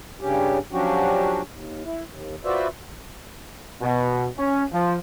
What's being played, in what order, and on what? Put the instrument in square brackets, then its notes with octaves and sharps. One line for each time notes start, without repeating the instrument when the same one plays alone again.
[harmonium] G2 C#3 C#4 G4
F3 F#3 C#4 D4 F#4 G4
D#2
E4
D#2
F4 F#4 B4 C5 D5 E5
[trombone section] B2
C#4
F3